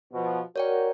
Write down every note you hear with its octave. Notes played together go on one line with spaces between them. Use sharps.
B2 F3
F#4 A#4 C#5 D5 G5